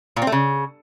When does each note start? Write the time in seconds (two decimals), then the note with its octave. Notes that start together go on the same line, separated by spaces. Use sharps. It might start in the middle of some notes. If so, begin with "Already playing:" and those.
0.16 A#2
0.22 C4
0.27 A3
0.32 C#3